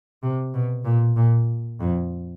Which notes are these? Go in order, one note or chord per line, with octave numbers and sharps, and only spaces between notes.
C3
B2
A#2
A#2
F2